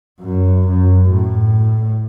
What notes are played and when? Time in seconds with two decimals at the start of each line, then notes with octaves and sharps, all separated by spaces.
0.21 F#2
0.67 F#2
1.10 A2